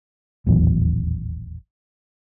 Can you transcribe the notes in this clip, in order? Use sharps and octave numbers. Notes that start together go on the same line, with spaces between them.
D#1 A1 E2 F#3